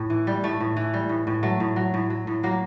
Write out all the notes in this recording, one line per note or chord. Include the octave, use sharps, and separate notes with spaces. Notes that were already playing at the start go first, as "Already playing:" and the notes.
Already playing: A2
E3
G3
A2 A3
A2
E3
G3
A2
A2
F#3 A3
A2
F#3
A2
F#3
A2
F#3 A#3